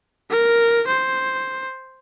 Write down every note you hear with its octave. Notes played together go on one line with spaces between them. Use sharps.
A#4
C5